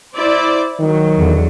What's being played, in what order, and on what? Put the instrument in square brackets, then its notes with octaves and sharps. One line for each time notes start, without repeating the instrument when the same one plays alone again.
[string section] E4 C5 D5
[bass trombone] D#3 [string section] F#3
[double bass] E2 D3